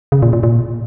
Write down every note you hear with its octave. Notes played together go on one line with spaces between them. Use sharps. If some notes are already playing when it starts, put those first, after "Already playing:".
C#3
A#2
A#2
A#2